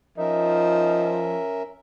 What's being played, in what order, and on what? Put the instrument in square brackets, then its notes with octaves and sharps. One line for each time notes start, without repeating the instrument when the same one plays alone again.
[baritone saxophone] F3 [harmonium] C#4 A#4 E5 [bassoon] D#4